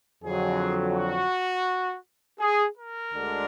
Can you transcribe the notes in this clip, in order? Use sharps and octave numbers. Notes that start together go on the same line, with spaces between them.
F2 D3 F#3 G#4
F#4
G#4
A#4
D2 D3 G#3 D4